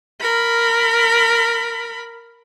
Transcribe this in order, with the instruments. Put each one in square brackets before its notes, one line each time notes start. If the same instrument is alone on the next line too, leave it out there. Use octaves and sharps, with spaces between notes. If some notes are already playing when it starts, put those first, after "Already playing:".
[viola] A#4 B5